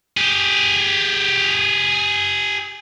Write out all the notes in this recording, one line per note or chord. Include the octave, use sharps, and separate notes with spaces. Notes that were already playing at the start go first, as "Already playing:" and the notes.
G4 G#4